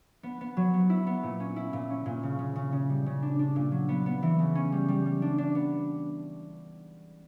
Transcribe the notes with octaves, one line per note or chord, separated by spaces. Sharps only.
B3
B3
F#3
B3
E4
B3
A#2
C#4
E4
A#2
C#4
A#2
C#3
C#3
C#3
C#3
G3
C#3
D4
D4
A#2
F#3
B3
B3
E3
C#3
C#4
G3
G3
G3
D4
D4
B3